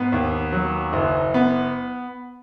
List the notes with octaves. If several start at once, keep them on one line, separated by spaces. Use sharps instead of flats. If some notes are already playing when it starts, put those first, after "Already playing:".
Already playing: G#2 B3
D#2
F#3
F#1
B3